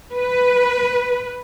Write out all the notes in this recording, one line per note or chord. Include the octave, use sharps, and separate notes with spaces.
B4